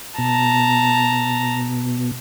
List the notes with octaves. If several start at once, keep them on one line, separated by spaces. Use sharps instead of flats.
B2 A5 A#5